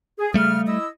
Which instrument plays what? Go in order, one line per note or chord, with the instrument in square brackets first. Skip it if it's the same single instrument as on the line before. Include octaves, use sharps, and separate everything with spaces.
[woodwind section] G#4
[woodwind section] C#3 F6 [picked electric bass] G3 A3
[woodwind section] E4 D#5 E6